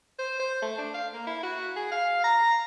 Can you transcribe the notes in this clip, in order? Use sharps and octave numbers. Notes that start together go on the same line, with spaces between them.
C5
C5
A3
D4
F5
A#3
E4
F#4
G#4
F5
A#5